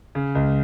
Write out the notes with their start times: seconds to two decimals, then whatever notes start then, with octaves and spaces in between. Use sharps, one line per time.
0.15 C#3
0.35 C#2